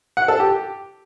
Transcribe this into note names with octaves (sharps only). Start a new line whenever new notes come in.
F#5
A4
G4